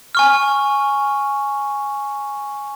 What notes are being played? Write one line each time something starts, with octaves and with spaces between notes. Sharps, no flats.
G#5 C#6 F6